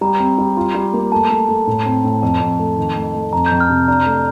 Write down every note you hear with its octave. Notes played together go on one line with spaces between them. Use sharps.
G3 A#5
C4
G3
F4
G3
A#3
A3 A5
A3
A3
A2
C4
A2
F2 A5
F2
A3
D#3
A3
A3
F2 A#5
G6
F2
F6
C3
D4 A#5
A3